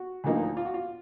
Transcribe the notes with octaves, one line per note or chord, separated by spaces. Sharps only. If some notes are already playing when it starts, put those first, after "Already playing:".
Already playing: F#4
D2 D3 F3 A#3 D#4
F4
F#4
F4